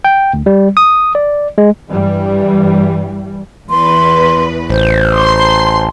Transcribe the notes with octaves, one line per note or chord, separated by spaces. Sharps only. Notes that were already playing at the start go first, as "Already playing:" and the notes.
G5
D2
G3
D#6
D5
G#3
G2 E3 G3
E2 B4 C6
A1 C5
C6